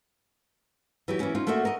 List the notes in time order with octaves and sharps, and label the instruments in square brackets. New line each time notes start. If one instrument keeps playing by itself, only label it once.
[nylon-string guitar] E3 F#3 G4
E3 A#3 C#4
C#4 D#4 F4
A3 A#3 D4 F#4 E5
A#4 D#5